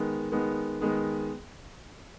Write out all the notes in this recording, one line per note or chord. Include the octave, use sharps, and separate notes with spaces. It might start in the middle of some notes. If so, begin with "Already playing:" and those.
Already playing: D#3 G#3 B3
D#3 G#3 B3
D#3 G#3 B3